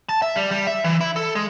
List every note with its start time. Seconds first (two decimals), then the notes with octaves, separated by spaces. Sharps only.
0.09 A5
0.22 E5
0.36 G3
0.51 G3
0.67 E5
0.84 E3
1.01 E4
1.16 A4
1.35 G#3